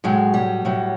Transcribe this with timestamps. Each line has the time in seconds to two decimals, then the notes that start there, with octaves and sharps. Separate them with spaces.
0.04 A2 F#3 G#3
0.34 G3
0.65 A2 F#3